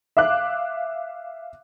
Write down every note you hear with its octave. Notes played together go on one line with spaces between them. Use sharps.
E5 F5 D6 F#6